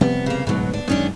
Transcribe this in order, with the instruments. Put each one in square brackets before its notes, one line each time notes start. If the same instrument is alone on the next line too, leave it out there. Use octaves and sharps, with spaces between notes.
[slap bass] C3 F3 G3 [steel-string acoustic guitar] B3
[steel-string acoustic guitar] C#3 A#3
[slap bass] D1 G#2 [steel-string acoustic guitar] B2 F#3
[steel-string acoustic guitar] D4
[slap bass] F#2 G#3 [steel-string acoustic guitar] D#3 C#4 D4